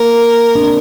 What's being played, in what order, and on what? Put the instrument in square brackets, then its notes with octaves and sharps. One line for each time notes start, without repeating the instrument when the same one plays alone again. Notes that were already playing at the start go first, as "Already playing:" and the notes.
Already playing: [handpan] A#3 [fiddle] A#4
[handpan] D4
C4